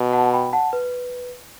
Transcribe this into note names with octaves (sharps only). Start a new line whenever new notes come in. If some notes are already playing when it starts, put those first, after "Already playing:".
Already playing: B2
F#5 A5
G5 B5
F#5 A5
B4